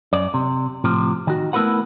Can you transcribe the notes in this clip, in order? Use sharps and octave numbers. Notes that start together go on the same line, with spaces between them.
F#2 D5
C3
A2 C3 F3
D#3 F#4
A3 B3 E4 A#4 B4 F#5